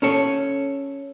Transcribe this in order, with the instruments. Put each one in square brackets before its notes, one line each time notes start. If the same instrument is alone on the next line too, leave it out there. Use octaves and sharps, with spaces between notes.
[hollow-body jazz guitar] C#4 A4 C#5